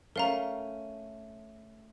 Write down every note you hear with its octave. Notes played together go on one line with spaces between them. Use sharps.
A3 C#4 A#4 F5 A#5